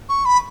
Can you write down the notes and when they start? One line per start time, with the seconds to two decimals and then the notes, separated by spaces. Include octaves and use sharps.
0.09 C#6
0.25 B5